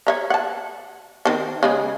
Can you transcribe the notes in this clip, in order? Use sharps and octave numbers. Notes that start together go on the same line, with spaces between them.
C#5 E5 A#5
F#5 A5
D#3 C4 A5
C#3 G#3 G#4